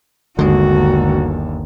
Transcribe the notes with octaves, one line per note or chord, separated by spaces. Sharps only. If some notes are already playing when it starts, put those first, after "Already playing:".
G1 D#2 D3 G#3 F#4